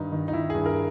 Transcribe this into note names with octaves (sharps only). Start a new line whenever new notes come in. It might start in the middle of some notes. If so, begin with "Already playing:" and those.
Already playing: G2 D#3 D#4
D#3
D#4
D#3 E4
G2 G#4
A#4